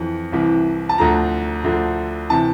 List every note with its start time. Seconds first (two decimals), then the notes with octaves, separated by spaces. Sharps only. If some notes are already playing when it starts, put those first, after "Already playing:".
Already playing: F2 E3
0.32 C2 C3 E3
0.89 A5
0.98 D2 D3 F3 A#5
1.64 D2 D3 F3
2.30 C3 E3 A5